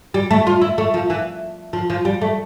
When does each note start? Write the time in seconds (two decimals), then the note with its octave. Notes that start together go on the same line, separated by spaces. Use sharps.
0.14 G3
0.31 A3
0.47 F4
0.61 E4
0.78 A3
0.94 F3
1.10 E3
1.73 F3
1.90 F3
2.05 G3
2.21 A3